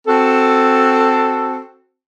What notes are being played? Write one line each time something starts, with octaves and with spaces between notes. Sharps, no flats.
C4 F#4 A4